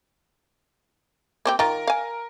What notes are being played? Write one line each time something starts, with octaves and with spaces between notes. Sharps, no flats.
A#3 C4 G4
D#3 F4 A#4
F5 G#5